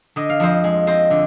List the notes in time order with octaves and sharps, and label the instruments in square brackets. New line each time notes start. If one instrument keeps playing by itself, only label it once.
[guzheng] D3 D#5
F5
F2 C5 D#5
G#3
C4 C5 D#5
D3